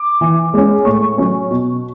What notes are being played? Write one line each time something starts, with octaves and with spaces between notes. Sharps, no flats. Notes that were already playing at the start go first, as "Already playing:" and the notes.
Already playing: D6
E3
G#3 C#4
A2 C#6
F#3 C#4
B2